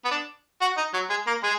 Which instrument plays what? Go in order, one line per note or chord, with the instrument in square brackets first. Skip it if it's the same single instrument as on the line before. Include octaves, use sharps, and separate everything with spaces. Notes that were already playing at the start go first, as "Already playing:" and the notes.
[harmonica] B3
D4
F#4
D#4
F#3
G#3
A#3
G#3